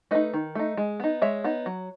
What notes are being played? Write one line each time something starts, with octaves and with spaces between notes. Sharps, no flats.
A3 D#4 B4 D#5
D#3
A3 D#4
G#3
B3 D#4
G#3 C#5 E5
B3 D#4
F#3